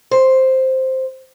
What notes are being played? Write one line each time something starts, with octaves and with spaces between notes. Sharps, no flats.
C5